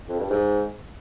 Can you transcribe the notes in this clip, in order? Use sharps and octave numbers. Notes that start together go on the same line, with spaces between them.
F2
G2
G#2